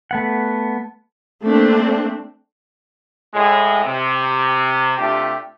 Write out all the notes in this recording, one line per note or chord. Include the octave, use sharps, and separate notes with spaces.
A3 B3 F#5
A3 A#3 C4 D4
A2 G#3
C3
C3 A3 D4 F4 G4